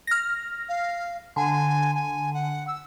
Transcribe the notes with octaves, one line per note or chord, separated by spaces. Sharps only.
F6 A#6
F5
D3 G#5
G#5
F#5
E6